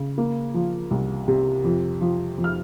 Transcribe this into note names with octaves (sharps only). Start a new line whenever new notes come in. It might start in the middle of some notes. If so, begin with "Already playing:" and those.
Already playing: C#3
A#3
F3
C2
C3
F2
F3
F2
F6